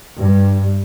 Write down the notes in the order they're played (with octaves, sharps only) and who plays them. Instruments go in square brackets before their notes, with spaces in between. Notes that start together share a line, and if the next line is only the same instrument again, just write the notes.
[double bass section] G2